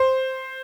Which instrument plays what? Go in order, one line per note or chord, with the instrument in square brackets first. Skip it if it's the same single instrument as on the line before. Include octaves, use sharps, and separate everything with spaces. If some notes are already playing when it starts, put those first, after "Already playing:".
Already playing: [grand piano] C5